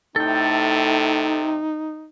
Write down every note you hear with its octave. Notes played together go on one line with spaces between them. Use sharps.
A2 C3 D#4 A4 G5